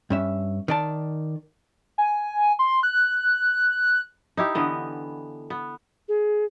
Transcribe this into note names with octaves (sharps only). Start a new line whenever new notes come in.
G2 C#4 E5
D#3 D5 A5
G#5
C6
F#6
D#4 E4 G4
D3 E3 B3 D#5
B3
G#4